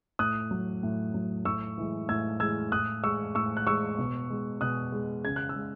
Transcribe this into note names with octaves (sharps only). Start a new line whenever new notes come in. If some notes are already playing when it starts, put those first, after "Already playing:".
A2 D#6 F#6
F#3
A2
F#3
A2 C#6 E6
E3 G#3
A2 E6 G#6
E3 G#3 E6 G#6
A2 D#6 F#6
G#3 C#6 E6
A2 C#6 E6
F#6
G#3 C#6 E6
B2
G#3
B2 D#6 F#6
G#3
C#3 G#6
F#6
E6
G#3